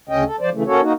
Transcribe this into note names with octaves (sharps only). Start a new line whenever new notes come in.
D2 C#3 C#4 D#5 G5
A4
F3 C5 D5
C#3 E3 A3
A#3 C#4 F#4 A4 C#5
A#3 D#4 F#4